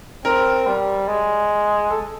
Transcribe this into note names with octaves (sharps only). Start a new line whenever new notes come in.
C4 A#4
G3
G#3
A4